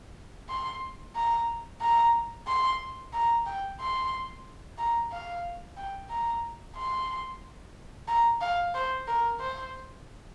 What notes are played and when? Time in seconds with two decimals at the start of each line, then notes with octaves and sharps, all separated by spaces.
0.49 C6
1.15 A#5
1.81 A#5
2.47 C6
3.13 A#5
3.46 G5
3.80 C6
4.78 A#5
5.12 F5
5.77 G5
6.10 A#5
6.76 C6
8.08 A#5
8.41 F5
8.75 C5
9.08 A#4
9.40 C5